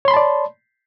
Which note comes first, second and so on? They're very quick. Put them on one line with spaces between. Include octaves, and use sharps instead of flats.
C#5 C6 B5 A5 D5